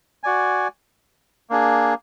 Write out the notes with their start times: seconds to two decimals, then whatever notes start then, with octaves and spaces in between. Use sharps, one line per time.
0.24 F#4 D5 G#5
1.50 A#3 D4 G#4